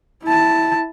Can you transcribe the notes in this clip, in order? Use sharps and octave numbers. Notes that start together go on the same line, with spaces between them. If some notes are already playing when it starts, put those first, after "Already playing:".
E4 A5